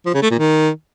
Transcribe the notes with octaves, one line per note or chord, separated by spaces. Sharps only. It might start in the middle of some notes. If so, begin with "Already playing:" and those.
F3
C#3
A3
A#2
D#3